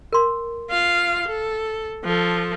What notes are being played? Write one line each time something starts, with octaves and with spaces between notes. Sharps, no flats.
A#4 C6
F4 F5
A4
F3 A4